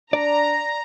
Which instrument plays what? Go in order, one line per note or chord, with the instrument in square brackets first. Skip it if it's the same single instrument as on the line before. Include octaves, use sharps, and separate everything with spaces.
[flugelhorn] D4 [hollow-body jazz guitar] D5 [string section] A#5